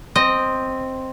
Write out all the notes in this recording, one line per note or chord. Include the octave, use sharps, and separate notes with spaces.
C4 D#5